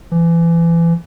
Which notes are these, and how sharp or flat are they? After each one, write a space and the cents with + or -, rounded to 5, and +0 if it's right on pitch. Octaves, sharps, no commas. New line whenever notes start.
E3 +30